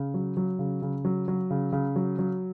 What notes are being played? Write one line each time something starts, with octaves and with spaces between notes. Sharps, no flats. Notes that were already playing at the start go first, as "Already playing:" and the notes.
Already playing: C#3
F#3
F#3
C#3
C#3
F#3
F#3
C#3
C#3
F#3
F#3